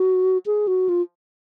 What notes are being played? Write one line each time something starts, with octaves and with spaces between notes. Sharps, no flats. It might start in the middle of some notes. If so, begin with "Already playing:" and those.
Already playing: F#4
G#4
F#4
F4